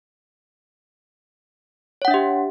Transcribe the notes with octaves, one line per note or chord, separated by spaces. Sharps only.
D4 G4 C#5 E5 F#5